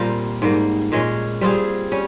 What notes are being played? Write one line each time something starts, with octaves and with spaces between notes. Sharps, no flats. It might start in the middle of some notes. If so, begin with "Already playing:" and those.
Already playing: A#2 G3 A#3 C4 F4
G#2 G3 A#3
A#2 G#3 C#4
G3 C4 F4 G#4
G3 C#4